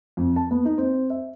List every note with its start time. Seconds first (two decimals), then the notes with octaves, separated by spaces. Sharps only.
0.17 F2
0.36 A5
0.51 B3
0.65 D#4
0.78 C4
1.10 E5